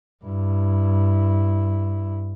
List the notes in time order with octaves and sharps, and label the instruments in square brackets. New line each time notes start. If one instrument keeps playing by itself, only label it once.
[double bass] G2 E4